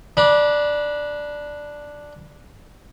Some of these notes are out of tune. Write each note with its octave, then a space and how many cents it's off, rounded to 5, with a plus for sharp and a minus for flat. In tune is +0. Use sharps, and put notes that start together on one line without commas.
D4 +0 B5 -35